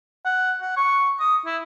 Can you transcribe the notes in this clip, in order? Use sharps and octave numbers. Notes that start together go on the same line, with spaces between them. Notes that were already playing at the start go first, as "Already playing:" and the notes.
F#5
F#5
C#6
D#6
E4